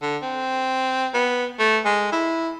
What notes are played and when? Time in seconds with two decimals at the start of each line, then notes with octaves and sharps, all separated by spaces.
0.02 D3
0.22 C4
1.14 B3
1.59 A3
1.85 G#3
2.12 E4